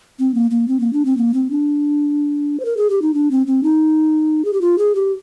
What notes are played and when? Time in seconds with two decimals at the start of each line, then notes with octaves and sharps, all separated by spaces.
0.19 C4
0.34 A#3
0.51 A#3
0.68 C4
0.80 A#3
0.93 D4
1.05 C4
1.17 A#3
1.34 C4
1.50 D4
2.60 C5
2.65 A#4
2.77 G#4
2.90 G4
3.02 D#4
3.14 D4
3.31 C4
3.47 C4
3.63 D#4
4.45 G#4
4.53 G4
4.61 F4
4.78 G#4
4.95 G4